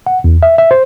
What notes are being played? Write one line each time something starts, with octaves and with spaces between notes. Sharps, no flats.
F#5
E2
E5
E5
C5